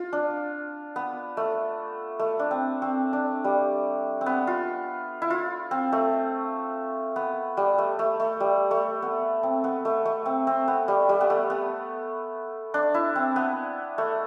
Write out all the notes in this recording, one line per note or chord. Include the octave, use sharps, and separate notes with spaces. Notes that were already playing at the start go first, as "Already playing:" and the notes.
Already playing: F4
D4
B3
A3
A3
D4
C4
C4
D4
G3
C4
B3
F4
E4
F4
C4
A3
B3
G3
A3
A3
A3
G3
A3
B3
C4
B3
A3
A3
C4
C4
B3
G3
G3
B3
A3
B3
D4
E4
C4
B3
A3